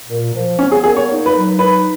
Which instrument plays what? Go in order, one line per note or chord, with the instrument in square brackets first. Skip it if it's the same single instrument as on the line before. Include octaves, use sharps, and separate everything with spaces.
[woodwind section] A#2
F3
[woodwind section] B3 [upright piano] C#4
[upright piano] G#4
[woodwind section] A#2 [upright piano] G#4
[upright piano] C#5
[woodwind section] D#4
[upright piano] B4
[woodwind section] F#3
[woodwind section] D#4 [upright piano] B4